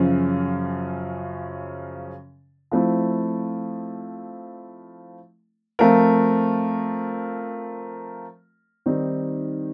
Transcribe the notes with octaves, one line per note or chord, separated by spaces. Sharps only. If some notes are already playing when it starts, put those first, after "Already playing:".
Already playing: F#2 C#3 F3
F3 A3 C4 E4
F3 A3 C4 F4 A#4
D#3 G3 C4 D#4